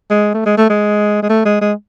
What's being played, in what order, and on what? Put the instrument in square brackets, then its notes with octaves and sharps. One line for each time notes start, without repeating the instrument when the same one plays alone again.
[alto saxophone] G#3
A3
G#3
A3
G#3
G#3
A3
G#3
G#3